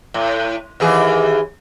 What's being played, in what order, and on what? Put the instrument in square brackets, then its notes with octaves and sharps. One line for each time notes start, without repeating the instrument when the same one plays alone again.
[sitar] A2
D#2 E3 G#4